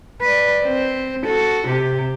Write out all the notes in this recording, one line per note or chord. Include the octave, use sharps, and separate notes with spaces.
B4 D5
C4
F#4 A4
C3 G4